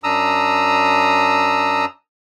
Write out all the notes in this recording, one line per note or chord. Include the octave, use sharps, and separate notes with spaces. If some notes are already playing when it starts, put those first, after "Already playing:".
F#2 D4 A#5 D#6 E6